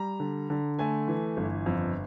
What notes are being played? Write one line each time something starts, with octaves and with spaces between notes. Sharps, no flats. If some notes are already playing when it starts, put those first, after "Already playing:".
Already playing: G3 A#5
D3
D3
A3 G#5
E3
G1
F2